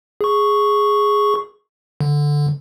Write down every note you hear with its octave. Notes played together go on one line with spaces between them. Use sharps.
G#4 C#6
D3